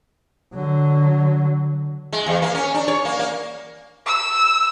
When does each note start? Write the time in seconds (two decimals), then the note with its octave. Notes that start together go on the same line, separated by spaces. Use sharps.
0.54 D3 F#3
2.12 G#3
2.26 E2
2.42 A#3
2.55 C#4
2.74 D4
2.88 C#5
3.05 A#3
3.19 A#3
4.07 E6